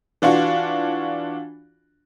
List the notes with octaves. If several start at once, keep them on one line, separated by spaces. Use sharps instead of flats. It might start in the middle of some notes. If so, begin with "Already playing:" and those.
E3 D4 F4 F#4